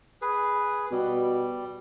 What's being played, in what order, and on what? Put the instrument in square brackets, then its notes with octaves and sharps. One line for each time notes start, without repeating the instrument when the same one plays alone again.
[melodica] G#4 B4
[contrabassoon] B2 [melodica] G3